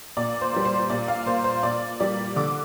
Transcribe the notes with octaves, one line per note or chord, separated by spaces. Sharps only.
A#2 D5
C5
G3 A#3
C5
C5
A#2 D5
F5
A#3 C5
C5
A#2 D5
G3 A#3 D5
D3 D6